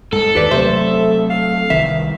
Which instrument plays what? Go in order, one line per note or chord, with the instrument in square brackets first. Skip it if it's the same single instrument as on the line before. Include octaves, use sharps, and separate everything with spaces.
[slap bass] G#2 G#3 [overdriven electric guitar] A4
[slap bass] D#2 [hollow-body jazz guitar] G4 B4 D5
[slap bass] C3 F#3 A3 [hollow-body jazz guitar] C5 [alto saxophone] E5
[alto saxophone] F5
[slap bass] C2 D#3 E3 [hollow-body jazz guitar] E5